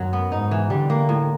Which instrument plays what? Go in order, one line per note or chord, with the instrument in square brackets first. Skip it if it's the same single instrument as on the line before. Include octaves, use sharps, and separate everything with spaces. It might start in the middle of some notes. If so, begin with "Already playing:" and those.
Already playing: [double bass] F#2 [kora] D#3 F#3
[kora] B3
[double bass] G#2 [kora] D#4
[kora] E3
[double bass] D3 [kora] G3
[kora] A#3
A2